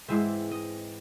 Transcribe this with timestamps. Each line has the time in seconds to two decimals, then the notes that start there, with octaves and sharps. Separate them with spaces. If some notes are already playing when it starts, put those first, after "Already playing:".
0.08 G#2 E3 G#3 C4 E5
0.51 D#5